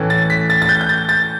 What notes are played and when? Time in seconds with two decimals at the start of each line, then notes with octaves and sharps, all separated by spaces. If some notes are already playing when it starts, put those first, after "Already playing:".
Already playing: A2 E3 A3 C#4
0.10 A6
0.30 B6
0.50 A6
0.62 A6
0.69 G6
0.81 G6
0.89 A6
1.09 A6